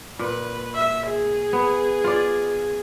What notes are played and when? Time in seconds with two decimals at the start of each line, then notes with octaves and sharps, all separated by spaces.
0.19 A#2 B4
0.74 E5
1.08 G#4
1.53 B3
2.04 F4 D5